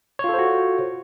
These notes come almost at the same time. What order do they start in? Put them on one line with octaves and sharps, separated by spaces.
C#5 F4 A4 C5 F#4